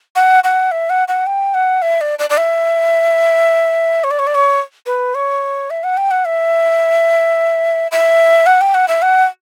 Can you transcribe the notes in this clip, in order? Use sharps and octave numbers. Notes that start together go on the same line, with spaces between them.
F#5
F#5
E5
F#5
F#5
G5
F#5
E5
D5
D5
D5
E5
C#5
D5
C#5
D5
C#5
B4
C#5
E5
F#5
G5
F#5
E5
E5
F#5
G5
F#5
E5
F#5